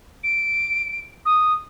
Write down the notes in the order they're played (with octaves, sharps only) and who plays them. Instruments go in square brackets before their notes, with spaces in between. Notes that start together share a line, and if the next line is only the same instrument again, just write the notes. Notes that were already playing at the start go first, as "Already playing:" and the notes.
[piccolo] D7
D#6